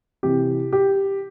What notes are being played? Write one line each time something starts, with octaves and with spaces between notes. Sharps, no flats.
C3 E3 G4
G4